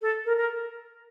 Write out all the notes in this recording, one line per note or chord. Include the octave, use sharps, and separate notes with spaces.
A4
A#4
A#4